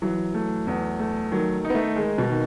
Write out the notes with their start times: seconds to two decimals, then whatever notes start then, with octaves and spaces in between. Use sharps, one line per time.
0.02 E3 F#3
0.34 A3
0.67 E2
0.99 A3
1.31 D#3 F#3
1.64 D#4
1.70 B3
1.75 A3
1.96 D#3 G#3
2.18 B2
2.29 D#3